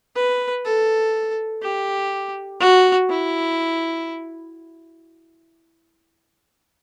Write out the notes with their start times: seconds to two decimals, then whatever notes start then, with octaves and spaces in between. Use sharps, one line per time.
0.16 B4
0.65 A4
1.62 G4
2.60 F#4
3.09 E4